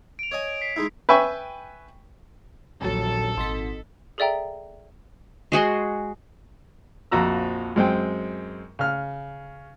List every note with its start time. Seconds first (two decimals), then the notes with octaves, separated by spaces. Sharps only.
0.19 D7 F7
0.31 C#5 D#5 G#5
0.61 B6 C7
0.76 G#3 D#4 E4
1.09 B4 E5 G5 G#5 C#6
2.81 D#1 A#1 F#3 A4
3.37 G#1 D#5 C6 B6
4.18 G#4 A4 D5 E5 G5 A#5
5.52 G#3 F#4 G#4 C6
7.11 A#1 F2 F#4 A#5 E6
7.76 F#2 G#3 C4 G5
8.79 C#3 F6